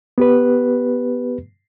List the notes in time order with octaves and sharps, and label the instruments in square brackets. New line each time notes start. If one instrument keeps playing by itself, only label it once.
[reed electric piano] B3 G4 B4